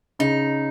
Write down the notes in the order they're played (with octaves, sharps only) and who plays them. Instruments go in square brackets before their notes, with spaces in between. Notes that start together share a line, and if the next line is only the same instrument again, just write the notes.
[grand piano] C#3 [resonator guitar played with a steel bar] D#4